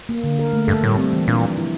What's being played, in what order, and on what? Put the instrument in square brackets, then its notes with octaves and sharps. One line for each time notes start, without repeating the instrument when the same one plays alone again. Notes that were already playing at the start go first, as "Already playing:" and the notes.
[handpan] A#3
D3
A#4
A3
[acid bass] G2 [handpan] A4
[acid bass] A2 [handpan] G3
[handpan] C4
E3
[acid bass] A#2 [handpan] D4
[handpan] F3
E4